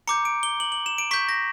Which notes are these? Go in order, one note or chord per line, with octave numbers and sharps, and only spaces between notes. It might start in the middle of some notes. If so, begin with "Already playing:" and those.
A#5 D6 G6 C#7
D7
G7
F#7
F#7
E7
D7
C#6 G6 B6
A#6